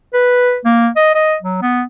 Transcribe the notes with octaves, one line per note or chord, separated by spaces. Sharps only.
B4
A#3
D#5
D#5
F#3
B3